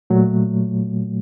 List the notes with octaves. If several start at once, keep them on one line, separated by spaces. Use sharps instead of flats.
A#2 F#3 A3